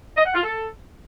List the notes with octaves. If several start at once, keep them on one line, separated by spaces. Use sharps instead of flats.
D#5
F#5
F4
A4